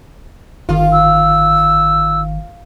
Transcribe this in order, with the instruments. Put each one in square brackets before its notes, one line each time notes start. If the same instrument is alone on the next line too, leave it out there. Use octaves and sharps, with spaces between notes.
[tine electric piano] G1 D#3 [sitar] F4
[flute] E6